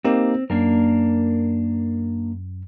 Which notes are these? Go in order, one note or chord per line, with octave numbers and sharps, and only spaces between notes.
A#3 C4 D#4 G4
F#2 A#3 D4 A#4